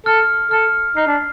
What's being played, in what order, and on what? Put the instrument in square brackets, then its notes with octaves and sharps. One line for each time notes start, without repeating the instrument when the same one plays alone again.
[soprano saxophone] A4 [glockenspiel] F6
[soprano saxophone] A4 [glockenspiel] F6
[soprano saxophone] D#4 [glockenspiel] C7
[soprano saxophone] D4